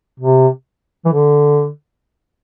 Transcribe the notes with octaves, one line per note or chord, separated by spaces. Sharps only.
C3
E3
D3